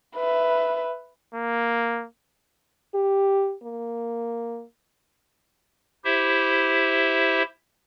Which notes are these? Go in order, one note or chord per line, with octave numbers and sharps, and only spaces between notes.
B4 E5
A#3
G4
A#3
E4 G4 C5 E5